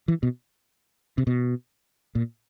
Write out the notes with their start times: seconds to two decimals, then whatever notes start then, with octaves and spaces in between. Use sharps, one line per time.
0.08 E3
0.23 B2
1.18 C3
1.27 B2
2.15 A#2